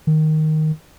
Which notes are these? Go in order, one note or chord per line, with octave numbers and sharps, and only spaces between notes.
D#3